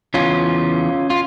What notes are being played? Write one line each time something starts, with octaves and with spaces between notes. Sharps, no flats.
E2 C#3 E3 C#4 F4
F4